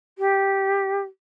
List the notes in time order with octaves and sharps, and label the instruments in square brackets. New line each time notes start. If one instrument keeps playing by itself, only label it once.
[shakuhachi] G4